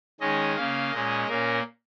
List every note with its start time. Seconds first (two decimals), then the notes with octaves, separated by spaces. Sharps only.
0.20 D#3 G#3 C#4 D#5
0.56 C#3 A#3 C#4 F5
0.92 A#2 G#3 C#4 D#5
1.27 A#2 A#3 C#4 A#4